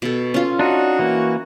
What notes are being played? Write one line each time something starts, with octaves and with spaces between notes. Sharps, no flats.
B2 A4
C#4 F4
D4 D#4 F#4
E3 A#3